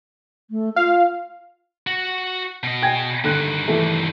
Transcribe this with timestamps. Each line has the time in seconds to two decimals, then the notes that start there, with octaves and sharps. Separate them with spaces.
0.50 A3
0.76 F4 F5
1.87 F#4
2.63 B2 D#5
2.82 G5 G#5 G#6
3.24 G2 D3 D#3 F#6
3.68 E3 A3